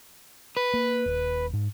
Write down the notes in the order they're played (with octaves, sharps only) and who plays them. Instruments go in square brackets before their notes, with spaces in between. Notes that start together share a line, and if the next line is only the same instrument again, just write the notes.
[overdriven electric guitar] B4
[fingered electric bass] A#3
D#1
G#2